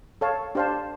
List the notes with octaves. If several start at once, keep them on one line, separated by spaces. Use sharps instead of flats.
A4 C#5 F5 A5
D4 G4 C5 F5 A5